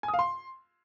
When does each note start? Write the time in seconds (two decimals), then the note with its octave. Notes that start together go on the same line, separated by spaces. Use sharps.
0.03 G#5
0.08 D#6
0.14 F5
0.19 C6